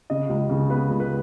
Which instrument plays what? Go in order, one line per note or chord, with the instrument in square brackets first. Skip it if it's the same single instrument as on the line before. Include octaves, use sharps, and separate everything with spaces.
[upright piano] C#3 D#5
C#2
C#3
B3 B4
C#2
B4